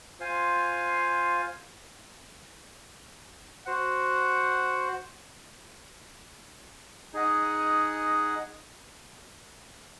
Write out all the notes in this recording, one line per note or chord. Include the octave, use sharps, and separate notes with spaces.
F4 C5 F5 G#5
F#4 C5 F#5
D#4 G#4 D#5 F#5